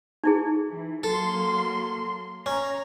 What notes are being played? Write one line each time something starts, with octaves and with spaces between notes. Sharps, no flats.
D#4 E4 G#4
E3
F#3 A#3 A4 C6
C#4 A#5